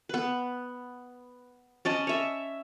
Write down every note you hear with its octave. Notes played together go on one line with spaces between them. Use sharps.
B3 B4
C#4 D5 D#5 A5
C#5 E5